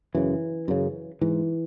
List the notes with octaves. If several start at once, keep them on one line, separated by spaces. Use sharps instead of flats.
F#2 C#3 E3
F#2 C#3
G#2 E3